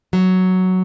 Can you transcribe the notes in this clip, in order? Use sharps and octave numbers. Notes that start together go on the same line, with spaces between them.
F#3